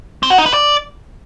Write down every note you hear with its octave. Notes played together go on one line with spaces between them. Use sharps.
C4
F#4
D#4
B4
D5